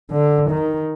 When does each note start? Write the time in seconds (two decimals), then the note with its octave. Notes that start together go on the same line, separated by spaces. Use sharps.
0.11 D3
0.51 D#3